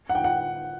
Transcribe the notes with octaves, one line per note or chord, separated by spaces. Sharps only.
F#5
G5
F#5